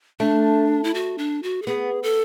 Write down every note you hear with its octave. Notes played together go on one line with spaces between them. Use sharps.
A3 D4
E4
F#4
D4
F#4
A4
B3 G#4
A4